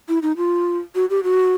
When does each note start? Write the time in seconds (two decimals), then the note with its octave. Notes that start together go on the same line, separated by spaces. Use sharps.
0.09 E4
0.22 D#4
0.37 F4
0.95 F#4
1.10 G4
1.24 F#4